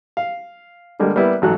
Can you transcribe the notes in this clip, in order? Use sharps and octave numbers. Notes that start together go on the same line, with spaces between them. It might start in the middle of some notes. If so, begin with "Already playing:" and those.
F5
D3 G3 G#3 A#3
G3 A#3 B3 E4 B4
A1 G#2 F#3 A4 F#6